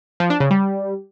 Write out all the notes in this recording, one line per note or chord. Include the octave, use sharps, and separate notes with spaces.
F3
D4
C#3
G3